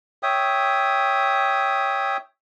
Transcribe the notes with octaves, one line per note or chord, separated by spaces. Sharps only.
C#5 E5 G5 D#6